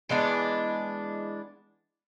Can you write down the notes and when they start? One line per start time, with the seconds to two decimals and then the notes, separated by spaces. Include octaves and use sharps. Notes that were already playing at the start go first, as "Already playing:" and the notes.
0.09 E3 G#3 B3 D4